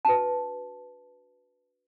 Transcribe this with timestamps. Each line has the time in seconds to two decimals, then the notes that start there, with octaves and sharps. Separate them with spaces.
0.05 D4 F#4 B4 A5